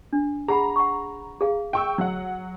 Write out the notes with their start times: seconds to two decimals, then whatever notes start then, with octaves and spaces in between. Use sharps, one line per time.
0.13 D4
0.48 G#4 F#5 A#5 B5
0.76 F#5 C#6
1.41 G#4 F5
1.73 G5 C#6 E6
1.98 F#3 F#5